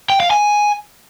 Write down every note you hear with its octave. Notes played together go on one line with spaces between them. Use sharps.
G5
F5
G#5